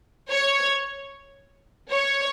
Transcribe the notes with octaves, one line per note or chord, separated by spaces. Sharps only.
C#5
C#5